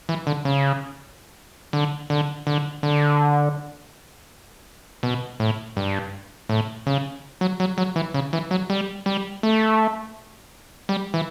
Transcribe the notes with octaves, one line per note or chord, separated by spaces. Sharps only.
E3
D3
C#3
D3
D3
D3
D3
B2
A2
G2
A2
C#3
F#3
F#3
F#3
E3
C#3
E3
F#3
G3
G3
A3
G3
E3